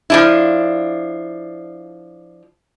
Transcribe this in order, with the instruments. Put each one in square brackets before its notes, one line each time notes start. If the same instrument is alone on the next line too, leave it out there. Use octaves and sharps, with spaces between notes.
[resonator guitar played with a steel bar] F3 D4 E4